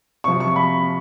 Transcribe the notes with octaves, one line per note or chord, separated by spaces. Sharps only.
C3 F3 C#6
C#6
B5